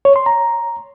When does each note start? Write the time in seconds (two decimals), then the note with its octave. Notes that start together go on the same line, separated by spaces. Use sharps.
0.05 C#5
0.16 C6
0.26 A#5